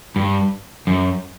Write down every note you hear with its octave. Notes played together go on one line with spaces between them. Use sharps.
G2
F#2